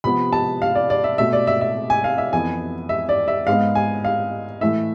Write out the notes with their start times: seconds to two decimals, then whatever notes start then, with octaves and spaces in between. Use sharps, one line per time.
0.04 C3 F3 B3 B5
0.33 A5
0.62 F5
0.75 D5
0.90 D5
1.04 E5
1.18 B2 A3 E5
1.33 D5
1.47 E5
1.61 E5
1.90 G#5
2.04 F5
2.18 E5
2.33 F2 E3 B3 G#5
2.89 E5
3.09 D5
3.28 E5
3.47 G#2 G#3 B3 F5
3.75 G#5
4.05 F5
4.61 A2 E3 A3 E5